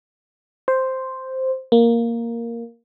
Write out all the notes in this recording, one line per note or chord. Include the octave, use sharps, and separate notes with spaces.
C5
A#3